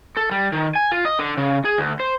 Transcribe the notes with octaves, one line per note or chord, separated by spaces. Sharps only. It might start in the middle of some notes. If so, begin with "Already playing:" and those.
A4
G3
D#3
G#5
F4
D#5
D3
C#3
G#4
D2
C5